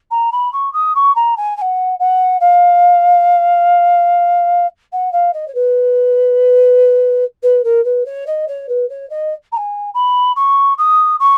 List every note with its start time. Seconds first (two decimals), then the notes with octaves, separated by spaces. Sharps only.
0.11 A#5
0.32 B5
0.52 C#6
0.73 D#6
0.95 C#6
1.15 A#5
1.37 G#5
1.57 G#5
1.61 F#5
1.99 F#5
2.40 F5
4.92 F#5
5.12 F5
5.33 D#5
5.47 C#5
5.54 B4
7.42 B4
7.64 A#4
7.84 B4
8.05 C#5
8.26 D#5
8.47 C#5
8.68 B4
8.89 C#5
9.09 D#5
9.52 A#5
9.56 G#5
9.94 B5
10.36 C#6
10.77 D#6
11.19 C#6